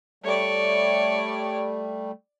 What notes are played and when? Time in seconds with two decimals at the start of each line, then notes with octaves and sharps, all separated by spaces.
0.24 G3 A3 C#5 D5